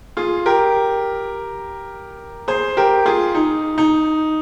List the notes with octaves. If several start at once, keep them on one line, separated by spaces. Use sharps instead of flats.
F4 G#4
G4 A#4
G#4 C5
G4 A#4
F4 G#4
D#4
D#4